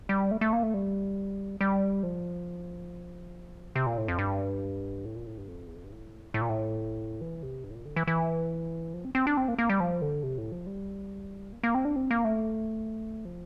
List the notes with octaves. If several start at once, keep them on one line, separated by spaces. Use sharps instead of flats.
G3
A3
A3
A#3
A3
G3
G3
F3
C3
A#2
A2
F2
G2
A2
A#2
A2
G2
F2
E2
F2
G2
A2
A2
A#2
A2
E3
C3
G2
A2
A#2
D3
E3
E3
F3
C4
C4
D4
C4
A#3
A#3
G3
F3
D3
C3
A2
F3
G3
A#3
A#3
C4
D4
C4
A#3
A3
F3